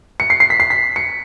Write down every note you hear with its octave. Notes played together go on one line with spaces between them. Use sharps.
C#7
C7
C7
B6
C7
B6
C#7